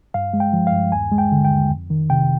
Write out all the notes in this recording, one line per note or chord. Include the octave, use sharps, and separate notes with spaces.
G2 F5
G#3
G5
F3
F5
G2
D#2 G#5
G#3
G5
D3
G5
D#2
F2
D#3
C3 G5